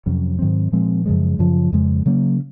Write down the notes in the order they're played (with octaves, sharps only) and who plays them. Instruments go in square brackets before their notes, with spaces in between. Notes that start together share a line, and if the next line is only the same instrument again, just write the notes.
[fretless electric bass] F2 C3 F#3 C#4
G#2 D#3 F#3 C4
A#2 F3 G#3 C4
F#2 C#3 F3 G#3
F#2 C#3 F3
F2 C#3 G#3
C#3 F#3 A#3 C#4